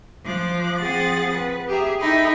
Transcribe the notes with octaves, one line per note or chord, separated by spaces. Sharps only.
F3 D6 F#6
F3 C4 G#4 F#5 A6
B4
G4 G#4 E5 A#5
D#4 E4 A4 G5 B5